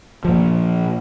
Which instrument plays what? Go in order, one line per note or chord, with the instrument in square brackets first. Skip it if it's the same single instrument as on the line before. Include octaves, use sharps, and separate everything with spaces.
[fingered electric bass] A#2 F3